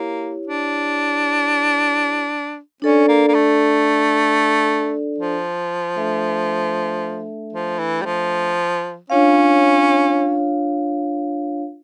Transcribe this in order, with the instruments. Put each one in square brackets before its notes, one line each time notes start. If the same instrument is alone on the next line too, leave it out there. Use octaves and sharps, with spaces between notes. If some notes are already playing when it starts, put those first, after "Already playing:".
Already playing: [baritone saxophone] A#3 [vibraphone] E4 G4 C#5
[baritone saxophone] D4
[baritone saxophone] C#4 [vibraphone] D4 A4 D5
[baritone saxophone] A#3
A#3
A3
F3
[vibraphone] A3 D4 A4 E5
[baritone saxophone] F3
E3
G3
F3
[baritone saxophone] C#4 [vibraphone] D4 F4 C#5 F5